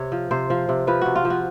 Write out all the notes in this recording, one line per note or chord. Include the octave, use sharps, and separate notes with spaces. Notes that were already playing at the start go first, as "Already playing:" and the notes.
Already playing: C3 C#5
F3
C3 C5
F3
C3
F3 B4
C3 F#4
F4
F3
F#4